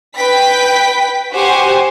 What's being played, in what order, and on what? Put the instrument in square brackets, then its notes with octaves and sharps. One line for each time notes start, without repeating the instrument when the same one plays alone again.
[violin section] B4 G5 B6
F#4 G4 C5 F#5 G#5 C6